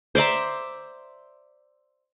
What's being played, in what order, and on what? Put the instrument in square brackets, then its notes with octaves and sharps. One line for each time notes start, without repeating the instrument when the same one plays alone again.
[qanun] C5 D5 E5 A#5